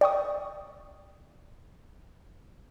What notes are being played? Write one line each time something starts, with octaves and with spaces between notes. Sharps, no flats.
D5 G5 C#6 D#6